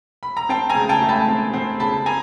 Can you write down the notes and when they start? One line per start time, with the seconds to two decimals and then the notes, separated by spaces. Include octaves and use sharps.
0.23 B5
0.37 A#5
0.49 C4 G5 A5
0.69 G#5 A#5
0.76 C#3
0.89 G5 A5
1.02 A3
1.09 A5 B5
1.28 C4
1.54 C4
1.80 C#3 A5 B5
2.06 G#5 A#5